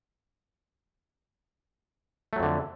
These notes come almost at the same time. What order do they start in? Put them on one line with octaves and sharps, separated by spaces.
A3 F#3 F2 D3